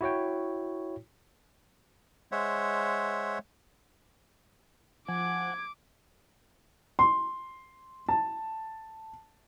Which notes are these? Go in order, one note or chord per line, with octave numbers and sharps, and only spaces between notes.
E4 F#4 C#5 G5
G#3 C5 C#5 E5 F#5
F3 F#5 G#5 D6 G#6
C6
A5